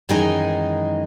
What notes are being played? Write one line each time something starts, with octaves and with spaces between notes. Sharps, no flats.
F#2 D#3 E3 G#3 D#4 G#5